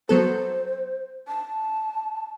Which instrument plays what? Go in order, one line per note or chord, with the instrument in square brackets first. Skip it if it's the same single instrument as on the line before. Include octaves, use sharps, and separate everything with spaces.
[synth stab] F#3 B3 A4 [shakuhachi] C5
[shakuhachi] A5